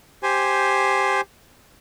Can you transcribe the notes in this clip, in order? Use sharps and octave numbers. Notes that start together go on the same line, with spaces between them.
G4 C5 G#5